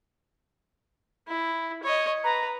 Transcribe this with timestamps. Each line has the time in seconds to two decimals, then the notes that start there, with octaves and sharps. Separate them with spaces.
1.28 E4
1.83 C#5 D#5
2.24 B4 A#5